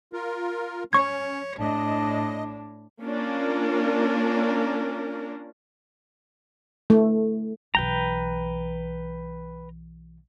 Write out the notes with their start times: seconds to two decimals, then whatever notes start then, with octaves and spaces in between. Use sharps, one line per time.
0.13 F4 A#4
0.93 C#4 C#5 C#6 G#6
1.59 A2 D4 D#5
3.03 A#3 C#4 D4 F4 A#4
6.90 A3
7.75 B1 E3 B4 G5 A#5